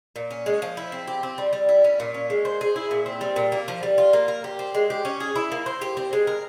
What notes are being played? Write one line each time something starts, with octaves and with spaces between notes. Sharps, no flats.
A#2
C#4
G#3
F3
E4
C4
G4
C4
G3
G3
E4
C#4
A#2
C#4
G#3
C5
G#4
E4
A#2
C4
G3
A#2
A#3
F3
G3
F4
A#3
A#4
G4
C4
G#3
G4
C#4
G#4
E4
A#3
C5
G4
C4
G#3
A#4